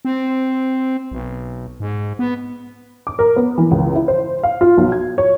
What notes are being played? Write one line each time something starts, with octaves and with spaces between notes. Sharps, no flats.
C4
B1
G#2
B3
D6
A#4
B3
E3
C#2
E4
C5
F5
F4
B1
G#6
C#5